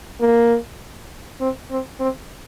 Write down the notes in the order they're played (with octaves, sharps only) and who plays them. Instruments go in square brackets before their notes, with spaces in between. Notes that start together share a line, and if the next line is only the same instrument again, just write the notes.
[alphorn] A#3
C4
C4
C4